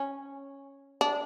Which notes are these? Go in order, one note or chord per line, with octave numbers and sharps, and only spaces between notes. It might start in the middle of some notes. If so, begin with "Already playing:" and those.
Already playing: C#4
D4